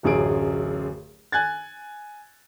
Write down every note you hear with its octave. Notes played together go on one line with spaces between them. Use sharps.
D1 A1 F#2 G#4 D7
G#5 F#6 G#6 A6